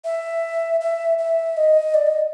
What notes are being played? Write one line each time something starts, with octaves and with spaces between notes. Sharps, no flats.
E5
E5
E5
D#5
D5
D#5